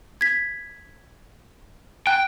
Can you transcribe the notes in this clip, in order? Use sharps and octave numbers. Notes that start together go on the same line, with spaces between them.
G#6 B6
G5 F#6